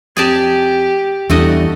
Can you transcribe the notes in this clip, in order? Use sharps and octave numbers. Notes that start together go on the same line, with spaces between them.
F2 G4 G#4 D5 A5
E2 G3 A3 D4 E4 F#4 D#5